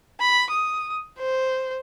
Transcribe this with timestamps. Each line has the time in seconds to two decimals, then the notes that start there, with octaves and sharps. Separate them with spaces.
0.20 B5
0.51 D#6
1.18 C5